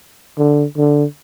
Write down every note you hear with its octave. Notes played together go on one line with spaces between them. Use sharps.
D3
D3